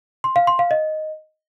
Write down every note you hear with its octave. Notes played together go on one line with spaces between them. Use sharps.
C6
F5
C6
F5
D#5